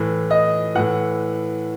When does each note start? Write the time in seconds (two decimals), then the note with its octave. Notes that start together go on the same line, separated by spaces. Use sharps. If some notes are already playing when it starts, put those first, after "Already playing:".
Already playing: A2 E3
0.31 D#5
0.75 A2 E3 F#5